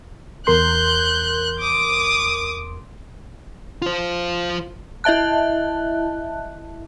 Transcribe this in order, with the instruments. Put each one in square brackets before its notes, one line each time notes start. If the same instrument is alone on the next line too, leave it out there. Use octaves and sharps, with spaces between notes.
[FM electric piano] E2 A#4 C6 [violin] F#6 G6
[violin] D6 D#6
[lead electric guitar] F4 C5
[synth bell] E4 D#5 E5 A5 F#6